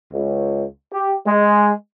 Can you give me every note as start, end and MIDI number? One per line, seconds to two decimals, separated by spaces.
0.13 0.64 37
0.92 1.14 67
1.26 1.72 56